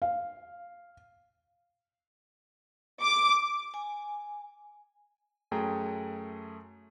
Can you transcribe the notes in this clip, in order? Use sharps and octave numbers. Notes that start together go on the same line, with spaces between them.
F5
D6
G#5
F#2 A3 G#4 G5 A#5